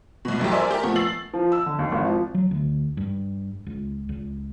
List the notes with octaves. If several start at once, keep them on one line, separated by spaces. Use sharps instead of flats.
C2 B2
A#1 G2 F#3 G4
A#4 C5 D5 E5 G#5 C6
G4 A#4
A#2 F3 A3 B3
E6 A6 C7 F#7
F3
E6
D3
D#2
G#1
F3
F#3
D2
G2
C#2
C#2